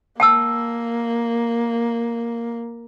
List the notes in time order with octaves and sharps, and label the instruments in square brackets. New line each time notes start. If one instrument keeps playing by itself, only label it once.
[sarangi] A#3 [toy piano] G5 A5 E6